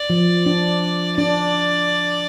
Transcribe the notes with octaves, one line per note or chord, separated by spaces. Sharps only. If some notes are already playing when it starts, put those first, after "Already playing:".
Already playing: D5
F3
D4
D4 D5